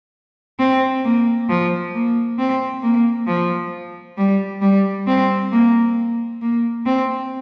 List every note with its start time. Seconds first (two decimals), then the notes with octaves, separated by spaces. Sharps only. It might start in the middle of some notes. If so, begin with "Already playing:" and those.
0.59 C4
1.04 A#3
1.49 F3
1.94 A#3
2.38 C4
2.82 A#3
3.27 F3
4.18 G3
4.61 G3
5.07 C4
5.52 A#3
6.42 A#3
6.85 C4